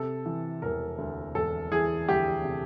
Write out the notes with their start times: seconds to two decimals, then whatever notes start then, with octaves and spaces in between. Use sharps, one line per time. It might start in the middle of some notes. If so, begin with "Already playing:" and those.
Already playing: C3 A4
0.26 E3
0.62 E1 A#4
0.98 D2
1.35 E1 A4
1.71 E3 G#4
2.08 D2 G4
2.44 C3